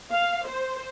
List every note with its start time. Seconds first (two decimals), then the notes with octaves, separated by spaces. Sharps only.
0.11 F5
0.46 C5